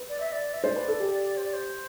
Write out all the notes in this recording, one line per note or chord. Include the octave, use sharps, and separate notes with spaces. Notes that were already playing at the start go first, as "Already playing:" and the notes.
Already playing: B4
D5
E5
D5
E5
C5 D5
B4
A4
G4
C5
D5
C5